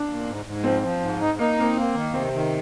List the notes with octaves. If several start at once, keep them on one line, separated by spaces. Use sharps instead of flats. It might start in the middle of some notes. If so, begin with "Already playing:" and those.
Already playing: D4
A#2
G#2
G#2
F3 C4
F3
G#2
D#4
A#3 D#4
A#3 C4
A#3
D#3
C3 C4
D#3